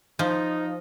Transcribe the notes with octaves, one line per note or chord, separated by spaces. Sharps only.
F3 D#4